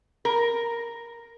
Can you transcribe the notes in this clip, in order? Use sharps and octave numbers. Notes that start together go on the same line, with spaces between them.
A#4